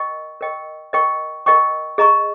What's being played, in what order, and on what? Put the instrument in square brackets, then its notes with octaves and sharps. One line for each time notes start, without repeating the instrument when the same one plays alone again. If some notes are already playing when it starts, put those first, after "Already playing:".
Already playing: [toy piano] A#4 D#5 G5 C#6
A#4 D#5 G5 C#6
A#4 D#5 G5 C#6
A#4 D#5 G5 C#6
G#4 D#5 A#5 C#6